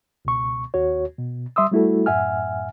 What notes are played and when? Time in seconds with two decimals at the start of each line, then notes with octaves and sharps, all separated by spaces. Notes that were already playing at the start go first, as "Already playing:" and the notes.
0.25 C#2 B2 C#6
0.74 D#2 F#4 C#5
1.18 B2
1.56 G3 E5 C6 D#6 E6
1.72 G3 A3 E4 F#4 A4
2.06 F#2 A2 E5 F#5 G#5 F6